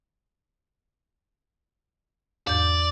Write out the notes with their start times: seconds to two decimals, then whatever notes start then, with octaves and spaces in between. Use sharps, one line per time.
2.47 E2 G#2 D5 G6